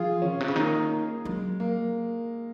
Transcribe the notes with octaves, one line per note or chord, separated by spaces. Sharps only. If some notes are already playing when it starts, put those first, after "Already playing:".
Already playing: F3 F4 G#4
C#4 F4
A#2
C3
C#3
D#3 A#3 C#4
A#3
F#3 G#3
A#3